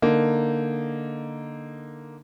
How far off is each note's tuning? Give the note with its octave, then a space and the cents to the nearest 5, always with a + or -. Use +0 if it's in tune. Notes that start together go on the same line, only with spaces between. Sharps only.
D3 +0 A#3 +0 D#4 +0